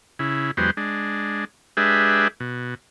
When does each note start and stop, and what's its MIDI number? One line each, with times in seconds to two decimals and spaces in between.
0.19 0.51 49
0.19 0.51 64
0.57 0.71 40
0.57 0.71 54
0.57 0.71 56
0.57 0.71 59
0.57 0.71 67
0.57 0.71 72
0.77 1.45 56
0.77 1.45 62
1.77 2.28 56
1.77 2.28 62
1.77 2.28 67
1.77 2.28 68
1.77 2.28 71
1.77 2.28 76
2.40 2.75 47